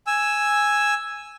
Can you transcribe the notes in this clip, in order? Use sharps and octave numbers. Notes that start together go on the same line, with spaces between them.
G#5 E6